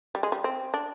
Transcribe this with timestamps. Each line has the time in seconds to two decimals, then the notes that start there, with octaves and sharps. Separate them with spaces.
0.15 G3
0.23 G#3
0.32 G3
0.44 C4
0.74 D4